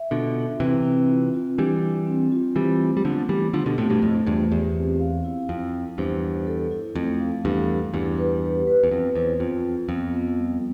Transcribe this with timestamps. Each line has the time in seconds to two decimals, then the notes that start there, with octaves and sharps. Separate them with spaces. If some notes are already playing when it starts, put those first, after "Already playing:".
Already playing: E5
0.11 B2 D3 F4
0.36 D4
0.60 C3 E3 C4
0.85 C4
1.09 F4
1.34 F4
1.58 E3 G3 D4
1.82 D4
2.07 C4
2.32 F4
2.56 E3 G3 C5
2.80 A3
2.97 G3
3.05 D3 F3 B3
3.29 E3 G3 B3
3.53 D3 F3 G4
3.66 B2 D3
3.78 A2 C3 A3
3.90 G2 B2
4.02 F2 A2 C5
4.26 E2 G2 F4
4.52 E2 G4
4.76 C4
5.00 F5
5.24 E4
5.49 F2 E4
5.74 E4
5.98 E2 G2 C5
6.23 D4
6.47 A4
6.71 E4
6.96 F2 A3
7.20 F5
7.44 E2 G2 A4
7.69 B3
7.94 E2 G2 E4
8.18 B4
8.42 G4
8.67 B4
8.83 E2
8.91 F2 B3
9.15 E2 C5
9.40 F2 F4
9.65 F4
9.89 F2 B3
10.14 B3
10.38 G3